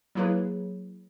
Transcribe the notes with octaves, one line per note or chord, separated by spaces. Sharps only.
F#3 A#3 E4 G#4 B4 C#5